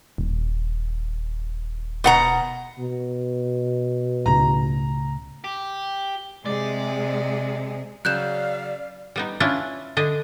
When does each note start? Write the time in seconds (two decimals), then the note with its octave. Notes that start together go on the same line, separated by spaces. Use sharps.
0.18 D#1
2.04 B2 F#5 A#5
2.79 B2
4.26 C#2 A2 C#3 A#5
5.44 G4
6.46 C3 G#3 G#4 D5
8.05 C#3 F#3 D5 F5 F#6 G6 E7
9.16 G3 B3 D#4
9.40 C#4 D4 E4 F4
9.97 D3 D4 D#5